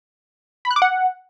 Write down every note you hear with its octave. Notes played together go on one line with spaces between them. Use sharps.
B5
F#6
D6
F#5